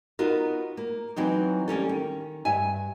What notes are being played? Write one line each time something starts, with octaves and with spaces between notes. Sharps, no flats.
B3 D#4 F4 F#4 A#4
A#3
E3 F#3 C4 D#4
G3 A#3 C#4 A4
D#3
G2 E5 G#5